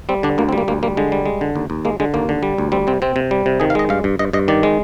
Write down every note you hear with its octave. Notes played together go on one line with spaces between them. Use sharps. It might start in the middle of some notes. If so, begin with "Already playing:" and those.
G3 C4
D3 D4
D2 A#3
C4
G3
A#3
D2 A#3
G3 A#3
D3 G#3
G3
G#3
D3
D#2
D#2
G#3 A#3
D3 G#3
D#2 A#3
D3
G3
D2
G3 C4
C3 C4
C3 C4
C3
G3
C3
D#3 G#4
F5
G#3 D#5
G2 F5
G2
G2 D#5
G2 D#5
D#3 D5
G#3